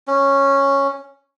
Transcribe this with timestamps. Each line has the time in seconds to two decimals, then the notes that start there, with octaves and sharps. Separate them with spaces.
0.08 C#4